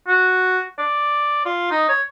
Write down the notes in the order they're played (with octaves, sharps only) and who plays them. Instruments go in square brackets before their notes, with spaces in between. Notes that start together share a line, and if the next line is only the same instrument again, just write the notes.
[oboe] F#4
D5
F4
D#4
C#5